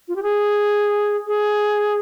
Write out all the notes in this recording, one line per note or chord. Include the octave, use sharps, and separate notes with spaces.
F4
G4
G#4
G#4